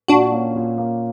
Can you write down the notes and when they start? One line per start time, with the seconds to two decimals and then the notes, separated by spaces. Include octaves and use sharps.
0.08 A#2 D4 F#4
0.32 A#3 C#4
0.55 A#2
0.78 A#3 C#4